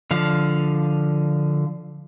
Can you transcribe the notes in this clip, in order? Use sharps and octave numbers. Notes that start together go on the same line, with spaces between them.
D3 F3 F5